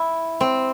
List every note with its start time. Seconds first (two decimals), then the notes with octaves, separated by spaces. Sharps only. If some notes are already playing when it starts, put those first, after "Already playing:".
Already playing: E4
0.41 C4